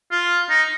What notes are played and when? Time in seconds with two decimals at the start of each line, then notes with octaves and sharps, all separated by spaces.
0.11 F4
0.50 D#4